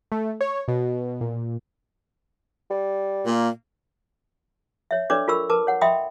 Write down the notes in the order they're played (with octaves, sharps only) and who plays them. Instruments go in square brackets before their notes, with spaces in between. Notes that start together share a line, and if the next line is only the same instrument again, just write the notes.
[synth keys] A3
C#5
B2
A#2
[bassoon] G3
[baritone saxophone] A#2 [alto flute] A#3
[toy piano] C#5 E5
D4 A4 B4 C#5 D5 D6
F4 A4 A#4 B5 C#6 E6
A#4 B4 A5 D6
C#5 F#5
D#5 E5 G5 B5 C6 D#6